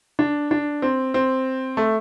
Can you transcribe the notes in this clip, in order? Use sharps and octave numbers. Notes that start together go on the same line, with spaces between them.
D4
D4
C4
C4
A3